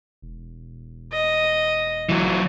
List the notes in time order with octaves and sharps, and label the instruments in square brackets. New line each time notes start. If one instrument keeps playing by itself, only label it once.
[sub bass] E1
[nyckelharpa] D#5
[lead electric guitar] E3 F#3